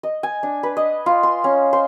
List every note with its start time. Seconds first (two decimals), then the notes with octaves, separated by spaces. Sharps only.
0.03 D#5
0.23 G#5
0.43 D4
0.63 B4
0.77 D#5
1.06 F4
1.23 C6
1.44 C#4
1.73 C5